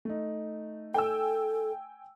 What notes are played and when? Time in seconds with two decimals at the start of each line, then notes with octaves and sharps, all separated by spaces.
0.05 A3 D#4
0.94 A4 G5 G#5 E6